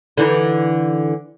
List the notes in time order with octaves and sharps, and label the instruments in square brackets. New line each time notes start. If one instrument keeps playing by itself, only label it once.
[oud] D3 E3 D#4